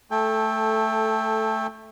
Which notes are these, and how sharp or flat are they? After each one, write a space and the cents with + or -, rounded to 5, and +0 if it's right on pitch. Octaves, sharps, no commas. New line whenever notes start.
A3 +0 A4 -10 G5 +25